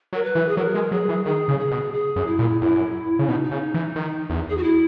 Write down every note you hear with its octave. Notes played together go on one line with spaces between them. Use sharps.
F#3 A#4
B4
E3
G#4
F#3 A#4
G#3
F#3 G#4
E3
D#3 G#4
C#3
G#4
B2
G#4
F#2
E4
A#2
F#2 E4
C#3
B2 D#4
D#4
C#3
E3
D#3
E2
G#4
F#4
E4